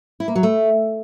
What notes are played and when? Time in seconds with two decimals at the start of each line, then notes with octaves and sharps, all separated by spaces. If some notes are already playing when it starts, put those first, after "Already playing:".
0.20 E4
0.28 A#3
0.35 F#3
0.43 A3